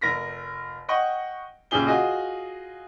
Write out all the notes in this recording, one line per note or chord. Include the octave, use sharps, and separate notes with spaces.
F1 A#4 A#6 B6
D#5 F#5 G5 C#6
A#1 C#3 G4 G#4 G7
F4 F#4 G#4 D#5